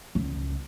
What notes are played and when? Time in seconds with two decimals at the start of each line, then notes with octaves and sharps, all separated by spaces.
0.15 C#2